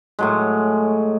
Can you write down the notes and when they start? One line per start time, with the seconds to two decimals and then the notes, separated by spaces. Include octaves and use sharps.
0.19 A2 F#3 G#3